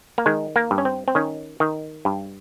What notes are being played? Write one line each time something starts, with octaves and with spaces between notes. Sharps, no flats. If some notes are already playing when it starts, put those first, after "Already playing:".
A#3
D#3 G#3
A#3
G2
C#4
C4
C4
D#3 C#4
D#3
G2